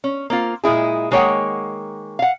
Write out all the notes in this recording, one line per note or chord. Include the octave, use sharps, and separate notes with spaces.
C#4
A#3 C4 F4
A#2 G#3 E4 G#4
D#3 G#3 A#3 C#5 F#5 G5
F5 F#5